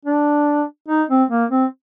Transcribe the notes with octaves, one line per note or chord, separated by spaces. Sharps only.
D4
D#4
C4
A#3
C4